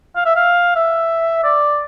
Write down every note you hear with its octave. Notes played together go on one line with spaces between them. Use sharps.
F5
E5
F5
E5
D5